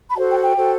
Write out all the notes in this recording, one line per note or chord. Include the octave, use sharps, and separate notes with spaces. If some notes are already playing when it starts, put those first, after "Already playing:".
B5
F#4 A4 C5 A5
G5
G5
F#4 A4 C5